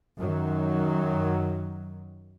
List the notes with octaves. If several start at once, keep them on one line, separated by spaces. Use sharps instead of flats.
F#2 D#3 F#3